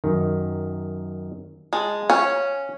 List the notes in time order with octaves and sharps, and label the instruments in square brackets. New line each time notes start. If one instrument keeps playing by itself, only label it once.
[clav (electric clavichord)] F#2 D#3
[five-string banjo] G#3 [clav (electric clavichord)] A5
[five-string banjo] C#4 [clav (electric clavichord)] F5